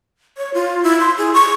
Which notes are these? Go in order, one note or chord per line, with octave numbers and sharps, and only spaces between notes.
C#5
F4
E4
C6
G#4
C#6